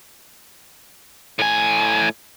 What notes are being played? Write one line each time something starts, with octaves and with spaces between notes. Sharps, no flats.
A2 G#5